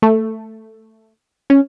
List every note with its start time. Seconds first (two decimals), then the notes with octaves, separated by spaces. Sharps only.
0.02 A3
1.50 C#4